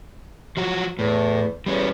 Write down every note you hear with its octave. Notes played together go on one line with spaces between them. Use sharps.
F3 F#3 F#4
E2 A2
E2 G3 C#4